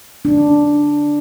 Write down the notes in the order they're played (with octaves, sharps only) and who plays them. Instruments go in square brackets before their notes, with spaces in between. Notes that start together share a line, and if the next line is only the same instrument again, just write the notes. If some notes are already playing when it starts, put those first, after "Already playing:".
[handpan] D4